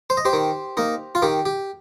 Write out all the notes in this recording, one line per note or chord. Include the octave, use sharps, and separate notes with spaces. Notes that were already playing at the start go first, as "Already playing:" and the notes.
C5
D#5
G4 C5
D#3
A#3 D#4
F4
D#3 G4
G4